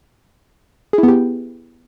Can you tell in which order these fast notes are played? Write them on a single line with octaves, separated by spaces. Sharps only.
G#4 E4 B3 G4